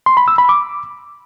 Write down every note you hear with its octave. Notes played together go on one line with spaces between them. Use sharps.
C6
B5
E6
B5
D6